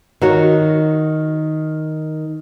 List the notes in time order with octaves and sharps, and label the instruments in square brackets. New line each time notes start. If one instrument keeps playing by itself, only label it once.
[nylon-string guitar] D#3 [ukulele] D#4 F#4 C#5